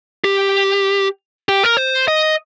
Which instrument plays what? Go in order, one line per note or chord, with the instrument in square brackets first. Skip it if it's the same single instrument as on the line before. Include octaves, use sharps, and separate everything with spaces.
[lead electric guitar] G4
G4
A#4
C5
D#5